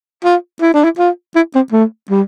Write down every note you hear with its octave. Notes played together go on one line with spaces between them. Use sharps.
F4
E4
D4
E4
F4
E4
C4
A3
G3